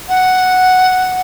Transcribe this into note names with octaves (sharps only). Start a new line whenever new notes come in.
F#5